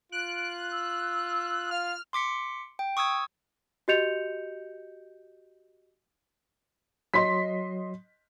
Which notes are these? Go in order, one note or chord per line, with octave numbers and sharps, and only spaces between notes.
F4 F#6 D7
E6
F5 F6
C6 D6 B6 C#7
G5
C#6 D#6 E6 G#6
F#4 G4 D#5 G6 C#7 F7
F#3 D#5 C6 B6